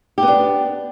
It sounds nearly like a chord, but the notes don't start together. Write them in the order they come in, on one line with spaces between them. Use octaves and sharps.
G4 B3 D4